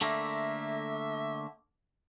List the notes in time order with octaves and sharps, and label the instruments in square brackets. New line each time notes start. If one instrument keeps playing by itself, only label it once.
[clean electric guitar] D3 A3 A#3 [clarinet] E5